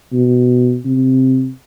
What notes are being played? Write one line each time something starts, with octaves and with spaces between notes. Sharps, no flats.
B2
C3